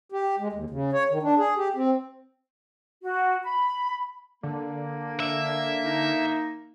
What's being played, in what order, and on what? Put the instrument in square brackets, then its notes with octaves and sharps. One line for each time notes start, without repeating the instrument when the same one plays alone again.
[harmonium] G4
G#3
D#2
C#3
C#5
D#3
D4
G#4
G4
C4
[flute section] F#4
B5
[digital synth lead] D3 [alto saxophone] A#3
[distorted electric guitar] E5
[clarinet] D#4